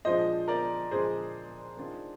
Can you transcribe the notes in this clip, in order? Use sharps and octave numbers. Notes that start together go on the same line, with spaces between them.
A#2 F3 G#3 D4 C5 D#5
A#4 D5
A#2 F3 G#3 D4 G#4 C5
D#3 G#3 D4 F4